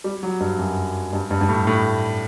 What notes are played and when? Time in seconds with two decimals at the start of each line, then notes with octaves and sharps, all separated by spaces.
0.04 G3
0.23 F#3
0.40 G2
0.59 F#2
1.13 G2
1.31 G2
1.41 G2
1.49 A2
1.67 A2